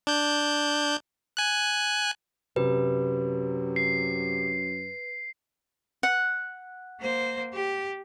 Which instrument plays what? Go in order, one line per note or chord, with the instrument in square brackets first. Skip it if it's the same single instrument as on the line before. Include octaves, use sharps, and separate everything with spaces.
[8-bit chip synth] D4 G6
G#5 F#6
[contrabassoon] F#2 [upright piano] C3 [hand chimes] B4
[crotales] C7
[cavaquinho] F#5
[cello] A#3 C5
G4